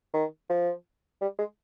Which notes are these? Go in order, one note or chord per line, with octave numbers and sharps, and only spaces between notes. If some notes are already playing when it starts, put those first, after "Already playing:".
D#3
F3
G3
G#3